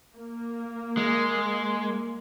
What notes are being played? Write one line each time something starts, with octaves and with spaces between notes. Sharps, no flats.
A#3
G#3